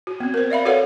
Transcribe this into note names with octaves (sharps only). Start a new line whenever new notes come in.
F#4
B3 C4
A#4 C5
D5 E5 F5 B5
F#4 A4 B4 C#5 F5 F#5